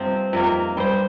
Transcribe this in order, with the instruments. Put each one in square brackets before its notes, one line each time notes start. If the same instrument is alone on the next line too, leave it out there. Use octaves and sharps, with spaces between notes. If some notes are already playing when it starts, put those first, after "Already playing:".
Already playing: [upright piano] G2 [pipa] C3 F3 C4
[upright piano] F2 [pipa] C3 D#3 A#3
[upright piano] G2 [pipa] G3 D#4 C5